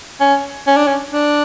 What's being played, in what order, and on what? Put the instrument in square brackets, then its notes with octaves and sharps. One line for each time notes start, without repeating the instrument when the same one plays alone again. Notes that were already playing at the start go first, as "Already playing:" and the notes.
[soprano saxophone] C#4
C#4
D4
C#4
D4